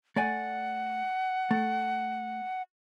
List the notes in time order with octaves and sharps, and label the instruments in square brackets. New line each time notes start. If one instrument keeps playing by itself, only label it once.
[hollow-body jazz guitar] A3 D5 G#5 [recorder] F#5
[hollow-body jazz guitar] A3